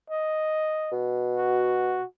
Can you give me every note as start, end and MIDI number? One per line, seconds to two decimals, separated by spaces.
0.10 0.93 75
0.92 1.99 47
1.37 2.05 66